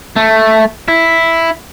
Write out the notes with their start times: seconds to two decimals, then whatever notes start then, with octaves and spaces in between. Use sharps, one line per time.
0.16 A3
0.88 E4